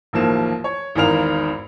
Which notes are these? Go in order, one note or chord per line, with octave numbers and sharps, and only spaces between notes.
A1 D#2 F3 A#3 E7
C#5
G#1 E2 D#3 A#4 F5 F7